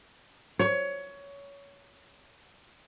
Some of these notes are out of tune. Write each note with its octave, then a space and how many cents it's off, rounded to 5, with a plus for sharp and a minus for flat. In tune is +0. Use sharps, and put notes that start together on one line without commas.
C#5 +20